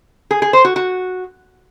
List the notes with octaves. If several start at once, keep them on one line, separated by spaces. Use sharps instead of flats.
G#4
G#4
C5
F#4
F#4